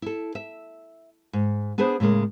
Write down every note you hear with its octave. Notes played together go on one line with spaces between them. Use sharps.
E4 A4
E5
G#2
B3 D4 G#4 B4 C5
A2 C#3 G#3 A#3